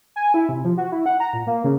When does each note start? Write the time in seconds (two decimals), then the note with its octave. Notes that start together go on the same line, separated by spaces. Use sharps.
0.16 G#5
0.34 E4
0.49 C3
0.64 F3
0.78 F#4
0.92 E4
1.06 F#5
1.20 A#5
1.33 A#2
1.47 A#3
1.64 C#3